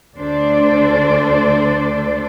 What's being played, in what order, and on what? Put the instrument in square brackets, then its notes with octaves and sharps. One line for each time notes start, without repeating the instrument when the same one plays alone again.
[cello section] D2 D4 A4 C5 D5